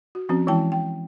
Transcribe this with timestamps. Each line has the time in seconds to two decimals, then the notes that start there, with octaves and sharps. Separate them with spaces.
0.15 F#4
0.29 F3 C4 C#4 F#4
0.47 E3 G#3 E4 G5 A5
0.72 G5